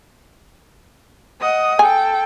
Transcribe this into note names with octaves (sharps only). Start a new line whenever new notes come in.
D#5 F#5 D#6
A4 G5 G#5